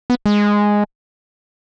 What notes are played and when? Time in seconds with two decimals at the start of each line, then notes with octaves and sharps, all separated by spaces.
0.10 B3
0.26 G#3